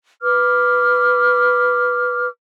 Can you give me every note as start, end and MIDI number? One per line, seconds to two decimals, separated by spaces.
0.22 2.27 71
0.22 2.27 86
0.22 2.27 89